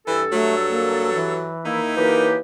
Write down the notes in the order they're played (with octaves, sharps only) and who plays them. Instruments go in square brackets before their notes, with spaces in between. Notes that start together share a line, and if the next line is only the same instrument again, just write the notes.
[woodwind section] G2 A4 [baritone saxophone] E3
[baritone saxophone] F#3 [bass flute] A3
[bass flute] A#3
E3
[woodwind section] D#3 A#3 E4 [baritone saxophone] D#4
[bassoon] E3 [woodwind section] F#3 A#3 G4 [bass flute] A#4